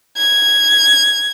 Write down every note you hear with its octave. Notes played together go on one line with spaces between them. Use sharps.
G#6